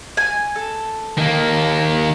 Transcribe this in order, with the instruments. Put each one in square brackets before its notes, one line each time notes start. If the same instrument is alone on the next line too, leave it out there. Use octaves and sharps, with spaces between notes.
[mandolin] G#5
A4
[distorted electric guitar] D#3 A#3